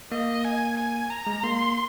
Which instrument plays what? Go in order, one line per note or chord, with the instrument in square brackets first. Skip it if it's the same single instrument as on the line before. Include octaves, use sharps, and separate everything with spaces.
[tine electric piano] A#3 [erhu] D#5
[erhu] G#5
G#5
A#5
[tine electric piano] G#3
[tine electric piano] A#3 [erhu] C6